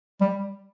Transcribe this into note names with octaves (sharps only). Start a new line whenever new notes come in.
G3